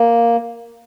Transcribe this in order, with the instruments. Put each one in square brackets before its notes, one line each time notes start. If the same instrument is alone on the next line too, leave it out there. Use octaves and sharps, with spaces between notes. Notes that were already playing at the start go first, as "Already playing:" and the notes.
Already playing: [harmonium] A#3